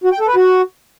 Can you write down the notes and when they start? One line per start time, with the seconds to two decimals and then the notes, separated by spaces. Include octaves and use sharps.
0.04 F#4
0.12 G5
0.20 A4
0.28 B4
0.36 F#4